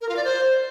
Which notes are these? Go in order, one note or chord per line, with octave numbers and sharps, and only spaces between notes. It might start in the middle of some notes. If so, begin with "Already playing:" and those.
A#4
F4
D5
C5